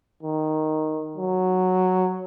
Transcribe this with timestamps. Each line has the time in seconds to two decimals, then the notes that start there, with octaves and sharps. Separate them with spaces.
0.23 D#3
1.17 F#3